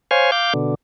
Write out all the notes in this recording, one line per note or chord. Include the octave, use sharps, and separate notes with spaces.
C5 C#5 F5 G#5
F5 D6 G6
B2 D3